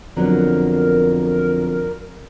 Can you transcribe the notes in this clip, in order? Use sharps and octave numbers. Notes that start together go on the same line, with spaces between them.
F2 D3 F#3 B3 A#4